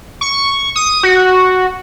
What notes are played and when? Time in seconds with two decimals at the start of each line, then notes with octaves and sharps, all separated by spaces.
0.21 C#6
0.76 D#6
1.03 F#4